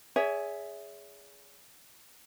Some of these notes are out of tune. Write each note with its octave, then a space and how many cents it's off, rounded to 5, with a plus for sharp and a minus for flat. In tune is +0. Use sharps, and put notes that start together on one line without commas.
G#4 +0 C#5 +35 E5 +0